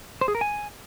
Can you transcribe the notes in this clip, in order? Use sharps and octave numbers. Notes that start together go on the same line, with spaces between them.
C5
G#4
A#4
G#5